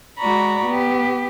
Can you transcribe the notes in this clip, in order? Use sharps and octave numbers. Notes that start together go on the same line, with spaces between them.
G#3 F#4 D5 A#5 B5 C#6
B3 G4